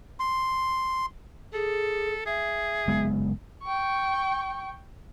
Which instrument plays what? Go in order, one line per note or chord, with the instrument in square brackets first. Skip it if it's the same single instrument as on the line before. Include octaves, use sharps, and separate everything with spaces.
[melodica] C6
[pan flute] G#4 [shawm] A4
[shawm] G#4 [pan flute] E5
[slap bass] F#1 G#3 B3
[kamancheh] G5 C#6